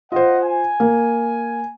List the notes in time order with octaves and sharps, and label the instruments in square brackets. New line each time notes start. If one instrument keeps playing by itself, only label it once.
[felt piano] F4 C5 [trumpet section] D#5 F#5
[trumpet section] G#5
[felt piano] A#3